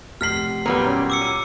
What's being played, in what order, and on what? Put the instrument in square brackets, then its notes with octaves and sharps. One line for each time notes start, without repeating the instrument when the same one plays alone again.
[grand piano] F1 B6 F#7 [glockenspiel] F6 C7
[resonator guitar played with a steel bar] A#2 F#3 G3 [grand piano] B3
[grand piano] C#4
[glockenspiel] D6 E6 C#7
[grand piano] D#7